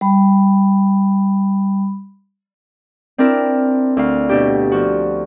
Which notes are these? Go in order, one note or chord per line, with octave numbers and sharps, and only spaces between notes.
G3 B5
C4 D4 E4 A#4
D2 F5
B2 D4 G4
F3 F#4